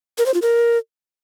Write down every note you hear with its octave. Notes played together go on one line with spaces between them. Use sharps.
A#4
C5
F4
A#4